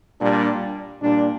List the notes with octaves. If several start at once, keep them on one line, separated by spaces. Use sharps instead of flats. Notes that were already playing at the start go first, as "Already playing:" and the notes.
A#2 G3 D4
A#2 G3 D4